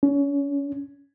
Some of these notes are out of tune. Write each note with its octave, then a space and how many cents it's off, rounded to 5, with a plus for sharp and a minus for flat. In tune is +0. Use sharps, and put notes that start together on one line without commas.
C#4 +30